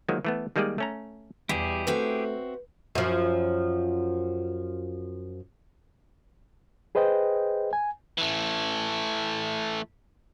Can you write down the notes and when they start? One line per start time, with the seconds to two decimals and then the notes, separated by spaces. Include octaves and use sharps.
0.09 D#3 F3 F#3 G#3 A#3
0.25 E3 A3 B3
0.56 D#3 G3 G#3 A#3 G#4 D5
0.78 A3 C#4 A#5
1.49 E2 B2 G3 E4 G4 G#4
1.87 A3 C4 F#4 B4 E5
2.95 F#2 F3
6.95 G#4 B4 C5 D#5 G5
7.73 G#5
8.18 E3 A3